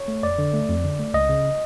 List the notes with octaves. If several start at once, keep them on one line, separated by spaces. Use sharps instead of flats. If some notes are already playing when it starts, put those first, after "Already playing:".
Already playing: C#5
A3
F2 D5
D3
A3
F2
D3
A3
C#2 D#5
C#3